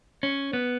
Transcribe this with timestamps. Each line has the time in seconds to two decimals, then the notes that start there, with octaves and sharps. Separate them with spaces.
0.23 C#4
0.53 B3